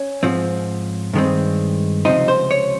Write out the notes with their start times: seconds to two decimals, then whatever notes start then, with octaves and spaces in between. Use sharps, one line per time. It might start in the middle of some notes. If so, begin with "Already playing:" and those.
Already playing: C#4
0.23 G#2 F3 C4
1.13 G2 D#3 G#3 C4
2.05 C#2 C3 F3 C4 D#4
2.28 C5
2.51 C#5